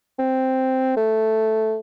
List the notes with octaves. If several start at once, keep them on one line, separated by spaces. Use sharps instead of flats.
C4
A3